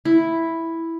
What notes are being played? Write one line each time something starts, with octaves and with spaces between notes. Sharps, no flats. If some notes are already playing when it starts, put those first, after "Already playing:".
E4